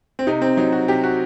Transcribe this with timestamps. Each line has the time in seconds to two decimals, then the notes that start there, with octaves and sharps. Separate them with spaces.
0.19 C4
0.27 C3 D#4
0.42 C4
0.57 F#3 D#4
0.72 F#4
0.88 C3 G4
1.03 F#4